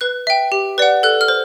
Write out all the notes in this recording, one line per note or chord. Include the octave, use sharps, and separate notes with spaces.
B4 F#6
E5 G5
G4
B4 D5 F#5
A4 F#6
F6
C5